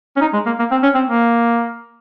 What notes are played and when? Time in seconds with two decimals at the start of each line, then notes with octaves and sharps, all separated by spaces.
0.16 C#4
0.21 D#4
0.33 G#3
0.46 A#3
0.59 A#3
0.71 C4
0.83 C#4
0.95 C4
1.08 A#3